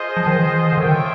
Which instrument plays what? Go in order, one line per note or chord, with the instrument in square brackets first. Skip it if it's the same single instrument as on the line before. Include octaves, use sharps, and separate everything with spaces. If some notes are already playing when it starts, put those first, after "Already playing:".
Already playing: [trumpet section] F4 G#4 C5 D#5
[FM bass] F3
D#3
E3
D3
[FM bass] D#3 [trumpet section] F4 A4 C#5 E5 G5